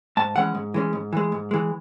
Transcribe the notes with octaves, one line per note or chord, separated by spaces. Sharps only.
G#2 A5
E3 G#3 C#4 F#5
G#2
E3 G#3 C#4
G#2
E3 G#3
G#2
E3 G#3